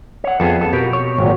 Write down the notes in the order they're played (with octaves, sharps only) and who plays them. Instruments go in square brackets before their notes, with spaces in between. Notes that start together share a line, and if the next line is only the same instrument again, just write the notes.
[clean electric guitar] C#5 F#5
[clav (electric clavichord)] F2 B3 [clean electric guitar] G#4 A4
[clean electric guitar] A4
[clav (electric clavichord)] B2 [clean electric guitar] G4 A#4
[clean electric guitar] C#5
[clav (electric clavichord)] G#1 [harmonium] A#2 F#3